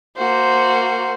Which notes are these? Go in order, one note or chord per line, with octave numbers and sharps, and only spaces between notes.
A#3 F#4 C5